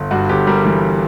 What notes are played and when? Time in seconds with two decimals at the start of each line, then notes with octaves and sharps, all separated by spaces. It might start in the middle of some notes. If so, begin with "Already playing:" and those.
Already playing: G1
0.11 G2 F#4
0.29 G1 G4
0.47 G3 A#4
0.65 E3